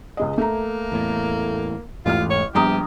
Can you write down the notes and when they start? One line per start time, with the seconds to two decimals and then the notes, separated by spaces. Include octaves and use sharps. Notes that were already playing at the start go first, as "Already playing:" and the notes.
0.17 C#2 G#3 D#5
0.38 A3 A#3 A#5
0.92 E2 A2
2.06 A1 E2 G#2 A3 F4 F6
2.30 C#5
2.55 A#1 G3 B3 G4 A#5 D#6